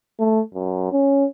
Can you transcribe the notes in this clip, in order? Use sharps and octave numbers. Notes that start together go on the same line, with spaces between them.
A3
F#2
C#4